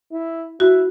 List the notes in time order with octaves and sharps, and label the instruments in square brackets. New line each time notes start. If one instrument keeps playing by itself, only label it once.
[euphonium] E4
[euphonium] E4 [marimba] F#4